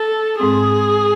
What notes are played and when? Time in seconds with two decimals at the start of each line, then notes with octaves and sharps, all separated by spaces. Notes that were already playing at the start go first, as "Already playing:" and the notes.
Already playing: A4
0.39 G#2 G#3 C4 G#4